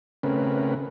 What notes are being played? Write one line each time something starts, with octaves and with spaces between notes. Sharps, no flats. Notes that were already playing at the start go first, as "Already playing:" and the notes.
C#3 A3 C4 C#4 A#4 B4